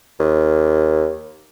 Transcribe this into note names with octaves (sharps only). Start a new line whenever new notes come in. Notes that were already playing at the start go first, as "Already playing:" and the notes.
D#2